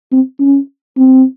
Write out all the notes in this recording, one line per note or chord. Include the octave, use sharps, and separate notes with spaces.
C4
C#4
C4